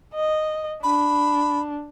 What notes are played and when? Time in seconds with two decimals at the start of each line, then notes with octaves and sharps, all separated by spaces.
0.14 D#5
0.83 D4 B5